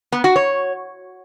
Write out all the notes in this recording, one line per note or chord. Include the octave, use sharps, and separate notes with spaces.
B3
F#4
C#5